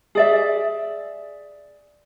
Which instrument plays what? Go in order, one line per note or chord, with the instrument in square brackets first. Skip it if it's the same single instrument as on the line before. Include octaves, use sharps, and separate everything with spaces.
[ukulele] G#4 D5 E5